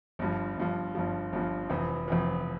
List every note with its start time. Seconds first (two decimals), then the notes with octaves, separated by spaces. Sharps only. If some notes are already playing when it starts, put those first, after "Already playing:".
0.19 G1 G2 F3
0.57 G1 G2 F3
0.95 G1 G2 F3
1.33 G1 G2 F3
1.70 F1 F2 E3
2.08 F1 F2 E3